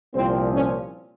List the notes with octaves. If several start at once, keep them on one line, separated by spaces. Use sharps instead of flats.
C2 A#2 F3 C4
C#4